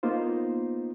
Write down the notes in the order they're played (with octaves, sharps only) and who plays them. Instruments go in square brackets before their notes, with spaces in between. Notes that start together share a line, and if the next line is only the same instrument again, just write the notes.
[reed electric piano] A#3 B3 D#4 F4 C5